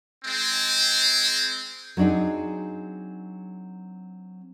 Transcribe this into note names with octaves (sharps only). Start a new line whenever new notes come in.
G#3 C4
F#3 C4 D4 D#4 G#4